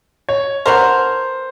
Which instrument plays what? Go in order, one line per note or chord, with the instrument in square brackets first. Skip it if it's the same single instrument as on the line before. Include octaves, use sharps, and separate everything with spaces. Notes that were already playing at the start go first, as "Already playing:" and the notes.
[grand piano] C#5
[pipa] B3 D4 F#4 A#4 [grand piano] C5